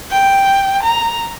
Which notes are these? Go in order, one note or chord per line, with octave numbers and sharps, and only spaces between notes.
G5
A#5